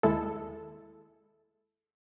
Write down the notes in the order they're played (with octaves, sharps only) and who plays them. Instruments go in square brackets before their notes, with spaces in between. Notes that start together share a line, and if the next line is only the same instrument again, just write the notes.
[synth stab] D#2 G#3 E4 A4